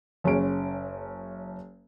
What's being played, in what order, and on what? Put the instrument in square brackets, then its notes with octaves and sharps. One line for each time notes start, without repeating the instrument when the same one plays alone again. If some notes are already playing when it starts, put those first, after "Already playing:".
[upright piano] F#1 C#4 G#4 D7